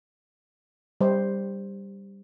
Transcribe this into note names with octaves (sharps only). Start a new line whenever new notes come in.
G3 C5